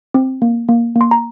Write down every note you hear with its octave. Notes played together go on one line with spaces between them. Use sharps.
C4
A#3
A#3
A#3
C6
A#5